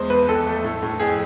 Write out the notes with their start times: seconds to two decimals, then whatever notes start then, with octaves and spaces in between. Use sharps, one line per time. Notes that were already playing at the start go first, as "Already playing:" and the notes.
Already playing: E2 G#3 C5
0.10 E2 B4
0.28 F2 A4
0.47 A3
0.64 A2
0.83 A2
1.00 F2 G#4